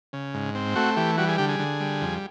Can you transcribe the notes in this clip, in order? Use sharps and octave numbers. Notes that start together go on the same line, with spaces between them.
C#3
G#2
C4
A3 F#4
E3 G4
G3 F#4
G#4
D3 G4
G#4
D3
G3
F2